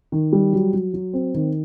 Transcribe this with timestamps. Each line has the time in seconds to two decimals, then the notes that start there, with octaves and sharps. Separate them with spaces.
0.12 D#3
0.33 G3
0.53 F#3
0.73 F#3
0.94 F#3
1.13 C4
1.34 D#3